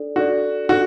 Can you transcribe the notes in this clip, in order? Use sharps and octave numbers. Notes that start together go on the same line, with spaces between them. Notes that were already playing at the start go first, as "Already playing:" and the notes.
Already playing: D4 A4 D5
D4 F#4 A4 D5
D4 F#4 A4